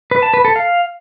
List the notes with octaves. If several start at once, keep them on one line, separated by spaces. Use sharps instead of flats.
B4
A5
B4
A4
F5